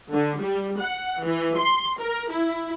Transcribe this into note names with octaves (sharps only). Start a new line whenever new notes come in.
D3
G3
F#5
E3
C6
A#4
E4